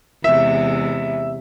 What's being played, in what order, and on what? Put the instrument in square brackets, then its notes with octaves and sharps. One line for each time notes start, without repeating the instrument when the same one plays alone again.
[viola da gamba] E2 C3 G#3 [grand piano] E5